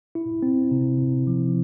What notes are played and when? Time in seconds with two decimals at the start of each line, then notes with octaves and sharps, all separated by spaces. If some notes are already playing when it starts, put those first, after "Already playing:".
0.15 E4
0.43 C4
0.71 C3
0.98 C3
1.27 F3